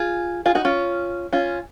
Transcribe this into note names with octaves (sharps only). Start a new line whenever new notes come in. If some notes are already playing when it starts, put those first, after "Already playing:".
Already playing: F4 G#4
F4 G#4
D#4 F#4
C#4 F4
C#4 F4